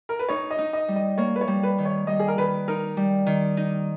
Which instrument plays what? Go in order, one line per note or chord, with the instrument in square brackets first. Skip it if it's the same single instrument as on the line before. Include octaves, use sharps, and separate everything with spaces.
[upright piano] A#4
B4
[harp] D#4 [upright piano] C#5
[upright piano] D#5
[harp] D#4
[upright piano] D#5
[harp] G3
[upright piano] D#5
[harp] A#3 [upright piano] C#5
[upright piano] B4
C#5
[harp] G3
[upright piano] B4
[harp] D#3
[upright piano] C#5
[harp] G3 [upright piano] D#5
[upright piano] G#4
A#4
[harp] D#3 [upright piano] B4
[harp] D#4 [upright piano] A#4
[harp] G3
D#3
D#4